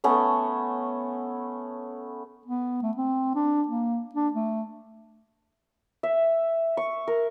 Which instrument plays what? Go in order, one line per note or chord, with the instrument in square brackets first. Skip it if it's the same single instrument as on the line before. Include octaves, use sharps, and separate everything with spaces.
[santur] A3 B3 C#4
[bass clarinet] B3
A3
C4
D4
A#3
D4
A3
[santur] E5
C#6
A#4